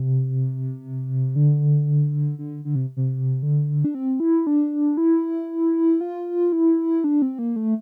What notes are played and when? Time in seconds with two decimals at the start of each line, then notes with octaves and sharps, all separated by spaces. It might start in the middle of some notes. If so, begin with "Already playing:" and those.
Already playing: C3
1.36 D3
2.39 D3
2.65 D3
2.75 C3
2.97 C3
3.43 D3
3.85 D4
3.95 C4
4.20 E4
4.47 D4
4.97 E4
6.01 F4
6.52 E4
7.04 D4
7.22 C4
7.39 A#3
7.56 A3